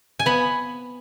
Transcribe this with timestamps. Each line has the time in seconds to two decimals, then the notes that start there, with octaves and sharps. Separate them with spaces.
0.19 G#5
0.26 B3 B5